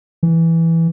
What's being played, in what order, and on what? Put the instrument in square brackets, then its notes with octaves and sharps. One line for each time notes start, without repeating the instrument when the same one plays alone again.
[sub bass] E3